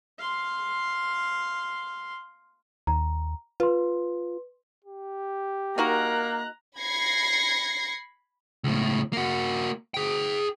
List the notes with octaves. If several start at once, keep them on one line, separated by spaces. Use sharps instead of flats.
F5 C6
D#2 A#5
F4 B4 C6
G4
A#3 D#4 F#4 A#4 A#5 F#6
B5 G#6 A#6 C7 C#7
C#2 A2
A#3 F#4
G#4 G5